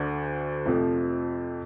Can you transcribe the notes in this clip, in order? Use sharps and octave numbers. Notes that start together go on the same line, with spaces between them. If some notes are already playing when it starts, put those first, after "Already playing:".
Already playing: D2 D3 A3 D4
F2 C3 F3 A3